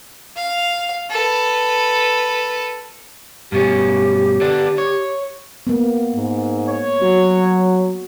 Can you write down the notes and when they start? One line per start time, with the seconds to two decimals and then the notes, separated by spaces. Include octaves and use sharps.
0.37 F5
1.11 A4 B4
3.52 G2 B2 C#4 G4
4.41 D3 B3 D4
4.78 C#5
5.67 A#3 B3
6.15 G#2
6.68 C#5
7.02 F#3 F#4